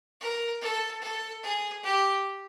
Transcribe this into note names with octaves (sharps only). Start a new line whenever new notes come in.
A#4
A4
A4
G#4
G4